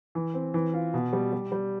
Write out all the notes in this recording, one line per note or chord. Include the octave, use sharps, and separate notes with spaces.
E3
C4
E3
F4
B2
G3
G3
G3